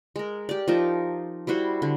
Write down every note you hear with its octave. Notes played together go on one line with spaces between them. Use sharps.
G#3 A#4
G4 D5
F3 D#4 A#4 A5
G3 E4 F#4 C5
D3